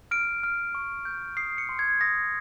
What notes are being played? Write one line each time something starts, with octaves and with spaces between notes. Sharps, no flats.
F6 D7
F6
C#6
G6
D#6 C7
C#7
C6
G#6
D#6 A#6